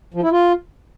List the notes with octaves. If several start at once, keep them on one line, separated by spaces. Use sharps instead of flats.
F3
E4
F4